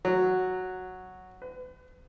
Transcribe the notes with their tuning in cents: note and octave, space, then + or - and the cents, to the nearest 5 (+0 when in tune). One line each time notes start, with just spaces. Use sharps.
F#3 +0
B4 +40